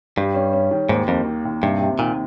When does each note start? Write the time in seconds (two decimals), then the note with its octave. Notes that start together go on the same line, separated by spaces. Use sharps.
0.17 G2 G3
0.35 C#4
0.53 C#4
0.71 D#3
0.89 D#2 G#2
1.08 F2 A#3
1.26 D#3
1.45 D#2
1.62 G2 C3
1.80 C3
1.99 A#2 D#3